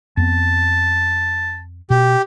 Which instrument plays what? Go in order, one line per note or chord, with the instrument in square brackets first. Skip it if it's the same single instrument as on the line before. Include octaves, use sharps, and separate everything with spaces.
[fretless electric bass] F2 B3 [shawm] A5
[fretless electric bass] B2 [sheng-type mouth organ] G4